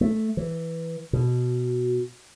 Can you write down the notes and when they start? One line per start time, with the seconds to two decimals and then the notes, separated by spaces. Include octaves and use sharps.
0.01 A3
0.37 E3
1.13 B2